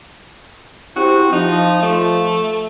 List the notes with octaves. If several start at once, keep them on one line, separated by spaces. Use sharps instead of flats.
C4 E4 F#4 G4
F3 D#4
A3